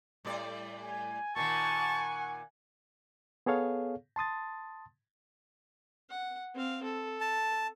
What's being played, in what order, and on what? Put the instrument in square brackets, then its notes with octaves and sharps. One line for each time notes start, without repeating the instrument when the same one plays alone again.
[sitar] A2 G3 D5
[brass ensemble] G#5
[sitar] A#2 D#3 [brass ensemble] F#5 G#5 [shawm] A5 [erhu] C#6
[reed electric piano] B3 G#4 A4 C#5 F5
A5 C6 D#6 A6
[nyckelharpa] F#5
C4 F5
A4
[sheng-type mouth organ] A5